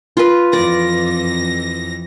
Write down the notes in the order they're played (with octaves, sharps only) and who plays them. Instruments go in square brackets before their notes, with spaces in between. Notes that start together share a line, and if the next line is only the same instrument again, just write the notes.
[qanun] F4 B4
[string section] F2 E3 A#6 [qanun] D5